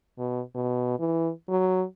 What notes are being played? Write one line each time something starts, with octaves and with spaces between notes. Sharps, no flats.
B2
B2
E3
F#3